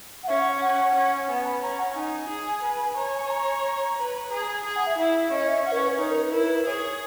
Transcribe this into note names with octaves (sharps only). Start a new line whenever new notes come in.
F#5
C#4 E5
F#5
F#5
C#4
B3 G#5
B5
C#4 A#5
F#5
D#4 G#5
G#4
B4
C#5 A#5
G#5
G#5
A#5
B4
G#4 A#5
G#5
G#4 G#5
F#5
E5
E4 E5
C#4 D#5
E5
C#4 F#5
A#4
B4
C#5
D#4 C#5
A#4
B4
E4 A#4
B4
A#4
G#4 C#5